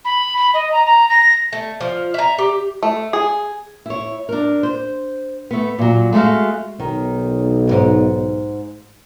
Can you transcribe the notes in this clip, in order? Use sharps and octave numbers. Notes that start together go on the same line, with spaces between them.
B5
B5
D#5
A#5
A#5
A#6
A3
F3
E5 A#5
G4
A3
G#4
E4 C#5
D4 A#4
C5
A3 B3
A#2 F#3
G#3 A3 D#4 F#4 F5
B1 D#3
D2 G#2